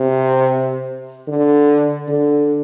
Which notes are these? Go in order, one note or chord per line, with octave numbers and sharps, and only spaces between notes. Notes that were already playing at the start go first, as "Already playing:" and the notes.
Already playing: C3
D3
D3